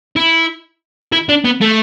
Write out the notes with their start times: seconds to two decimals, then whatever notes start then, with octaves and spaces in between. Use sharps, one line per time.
0.16 E4
1.12 E4
1.29 D4
1.45 B3
1.61 A3